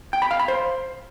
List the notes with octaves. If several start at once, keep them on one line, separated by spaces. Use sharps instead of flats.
G5
B5
F5
B5
C5